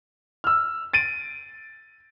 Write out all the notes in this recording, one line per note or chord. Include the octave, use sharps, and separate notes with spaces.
E6 F6
A6 D7 D#7